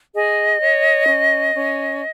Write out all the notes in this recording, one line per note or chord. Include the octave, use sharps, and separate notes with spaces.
G#4 D#5
C#5
C#4
C#4